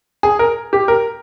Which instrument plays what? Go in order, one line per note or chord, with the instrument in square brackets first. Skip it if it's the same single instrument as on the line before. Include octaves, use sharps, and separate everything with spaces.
[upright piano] G#4
A#4
G4
A#4